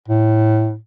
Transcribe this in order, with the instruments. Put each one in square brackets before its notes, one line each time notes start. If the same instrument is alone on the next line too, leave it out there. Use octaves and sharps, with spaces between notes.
[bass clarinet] A2